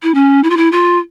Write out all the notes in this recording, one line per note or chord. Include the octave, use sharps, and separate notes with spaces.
E4
C#4
E4
F4
E4
F4